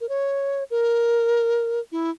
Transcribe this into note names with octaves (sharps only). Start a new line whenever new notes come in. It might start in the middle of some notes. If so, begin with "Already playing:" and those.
A#4
C#5
A#4
E4